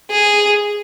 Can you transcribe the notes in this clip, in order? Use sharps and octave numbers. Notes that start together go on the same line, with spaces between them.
G#4